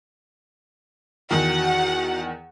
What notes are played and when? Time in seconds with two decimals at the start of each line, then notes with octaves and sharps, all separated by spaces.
1.31 E2 D#3 F#4 F#5